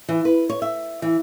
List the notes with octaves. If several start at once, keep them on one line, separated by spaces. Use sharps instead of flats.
E3
B4
C#5
E5
E3